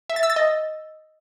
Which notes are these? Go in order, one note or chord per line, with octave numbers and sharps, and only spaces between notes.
E5
A6
E6
A6
D#5